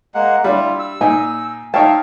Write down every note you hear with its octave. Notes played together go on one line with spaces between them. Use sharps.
G#3 A#3 F#5
G3 D4 E4 F4
E6
A#2 D#4 G#5
D#4 C#5 E5 F5 G5 A5